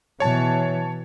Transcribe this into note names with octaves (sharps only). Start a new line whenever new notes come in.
B2 E3 C#5 A5